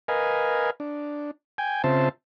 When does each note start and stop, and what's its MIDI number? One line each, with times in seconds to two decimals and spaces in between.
0.08 0.70 70
0.08 0.70 71
0.08 0.70 75
0.08 0.70 77
0.08 0.70 80
0.80 1.31 62
1.58 1.82 79
1.58 1.82 80
1.84 2.09 49
1.84 2.09 60
1.84 2.09 65
1.84 2.09 72
1.84 2.09 76
1.84 2.09 81